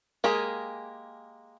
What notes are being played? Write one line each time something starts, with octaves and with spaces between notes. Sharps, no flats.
G#3 A#3 G4 G#4